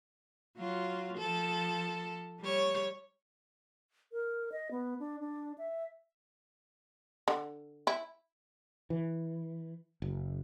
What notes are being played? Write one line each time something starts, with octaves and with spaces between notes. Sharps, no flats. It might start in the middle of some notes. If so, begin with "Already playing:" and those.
F#3 F4
F3 A4
G3 C#5
A#4
D#5
B3
D4
D4
E5
D3
E4
E3
F#1